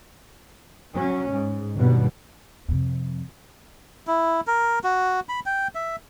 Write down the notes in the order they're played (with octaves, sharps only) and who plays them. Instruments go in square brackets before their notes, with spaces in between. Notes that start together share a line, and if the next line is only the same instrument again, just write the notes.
[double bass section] F#3 C#4
G#2
G1 D#2 B2 G3 B3
[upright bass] F2 C3
[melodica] E4
A#4
F#4
B5
G5
E5